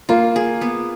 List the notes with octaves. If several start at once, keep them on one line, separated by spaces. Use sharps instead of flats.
A#3 F4
G#4
B3